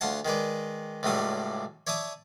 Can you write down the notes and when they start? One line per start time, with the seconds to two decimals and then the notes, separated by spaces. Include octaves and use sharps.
0.01 D2 F4 F#5 A5
0.25 D#3 G#3 B4 D5
1.03 C#2 A2 C#3 F#3 G3 D#6
1.87 C#5 D5 E5 A5 D#6